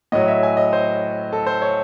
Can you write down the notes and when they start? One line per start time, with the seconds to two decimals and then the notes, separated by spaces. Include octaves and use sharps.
0.12 A2 F#3 D#5
0.28 E5
0.43 G#5
0.57 D#5
0.73 C5
1.33 A4
1.47 C5
1.62 C#5